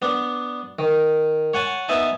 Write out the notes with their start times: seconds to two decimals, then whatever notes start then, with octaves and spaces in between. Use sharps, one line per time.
0.02 B3 D4
0.79 D#3
1.54 C#5 F#5 G#5 A5
1.89 B3 D#4 E5 G#5 A5